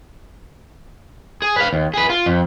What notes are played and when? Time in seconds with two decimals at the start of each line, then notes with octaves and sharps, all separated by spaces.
1.42 G#4
1.56 B4 F5
1.73 D#2
1.94 G#4 B4
2.10 F4
2.26 F2